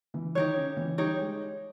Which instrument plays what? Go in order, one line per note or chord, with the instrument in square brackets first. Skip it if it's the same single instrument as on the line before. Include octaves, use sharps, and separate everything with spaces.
[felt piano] E3
[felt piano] D#3 [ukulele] D#4 G4 C#5
[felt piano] C#3
E3
[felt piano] G3 [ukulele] D#4 G4 C#5
[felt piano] G#3